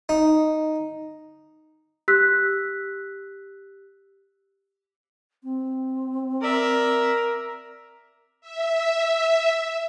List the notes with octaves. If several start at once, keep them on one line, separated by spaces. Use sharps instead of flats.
D#4
G4 E6 F#6 B6
C4
A#4 D5 E5
E5